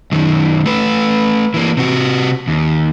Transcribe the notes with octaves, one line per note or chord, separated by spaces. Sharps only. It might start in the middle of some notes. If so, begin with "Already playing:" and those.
F#2 D#3
A3 B4
E3 A#3
C3 F#4
D#2